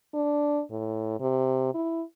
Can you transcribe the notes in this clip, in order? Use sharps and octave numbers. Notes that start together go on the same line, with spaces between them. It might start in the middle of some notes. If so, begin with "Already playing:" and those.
D4
A2
C3
E4